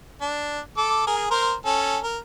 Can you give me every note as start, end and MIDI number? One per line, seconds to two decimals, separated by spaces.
0.21 0.60 62
0.77 1.03 69
0.77 1.03 86
1.07 1.26 68
1.07 1.26 70
1.31 1.53 70
1.31 1.53 72
1.66 1.98 61
1.66 1.98 69
2.04 2.18 70